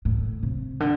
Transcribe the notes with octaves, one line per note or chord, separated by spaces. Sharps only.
A2
C3
D3